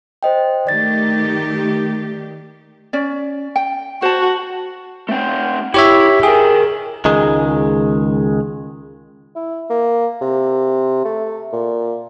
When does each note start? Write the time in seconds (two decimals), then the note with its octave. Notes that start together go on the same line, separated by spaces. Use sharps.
0.23 C5 D#5 G5
0.67 D#3 A3 G4 D5 A6
2.93 C#4 D5
3.56 G5
4.02 F#4 C5 A5
5.09 A3 C4
5.74 E4 G4 C#5 E5
6.23 G#4 A#4 G5
7.05 C#2 D#3 G#3
9.35 E4
9.70 A#3
10.21 C3
11.05 A3
11.53 A#2